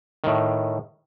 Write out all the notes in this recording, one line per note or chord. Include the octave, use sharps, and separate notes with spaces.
A2 D#3